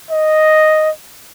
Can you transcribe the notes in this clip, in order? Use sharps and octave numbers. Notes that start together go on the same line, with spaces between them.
D#5